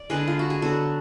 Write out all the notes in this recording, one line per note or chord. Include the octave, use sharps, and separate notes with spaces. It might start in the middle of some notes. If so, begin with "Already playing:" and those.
Already playing: D5
D3 G#3 D4 G#4 B4
F4
F#4
G#4
D3 F#3 B3 F#4 A4